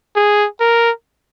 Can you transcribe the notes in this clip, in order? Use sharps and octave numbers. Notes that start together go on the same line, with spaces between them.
G#4
A#4